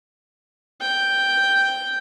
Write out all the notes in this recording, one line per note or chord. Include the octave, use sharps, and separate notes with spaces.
G5